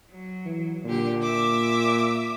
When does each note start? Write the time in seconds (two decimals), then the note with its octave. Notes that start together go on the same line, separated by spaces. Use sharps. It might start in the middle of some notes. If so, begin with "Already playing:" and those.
0.10 F#3
0.46 E3
0.85 A#2 D3 G4
1.22 E5 D6 E6